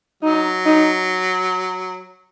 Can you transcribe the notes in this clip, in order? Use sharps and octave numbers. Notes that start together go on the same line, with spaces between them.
F#3 D#4
D#4